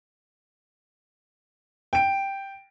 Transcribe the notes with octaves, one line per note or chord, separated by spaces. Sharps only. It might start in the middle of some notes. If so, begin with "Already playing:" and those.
G5 D7